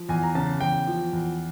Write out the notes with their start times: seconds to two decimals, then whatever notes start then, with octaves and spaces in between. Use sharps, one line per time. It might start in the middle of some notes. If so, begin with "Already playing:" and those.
Already playing: F3
0.09 E2 G#5
0.23 A#5
0.35 C#3 A5
0.61 E2 G5
0.87 F3
1.13 E2